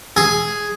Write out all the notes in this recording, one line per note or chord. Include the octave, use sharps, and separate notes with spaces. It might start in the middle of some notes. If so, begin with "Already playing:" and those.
G#4